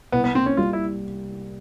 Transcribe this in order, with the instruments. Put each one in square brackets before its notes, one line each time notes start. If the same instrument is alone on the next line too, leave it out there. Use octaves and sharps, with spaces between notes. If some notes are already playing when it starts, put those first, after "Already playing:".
[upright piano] C2 [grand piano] B3
[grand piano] B3
[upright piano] A#3 [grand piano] C4
[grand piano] C#4
[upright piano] G3 [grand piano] F4
[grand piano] E4